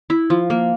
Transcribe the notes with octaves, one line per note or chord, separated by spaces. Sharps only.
E4
F3
A#3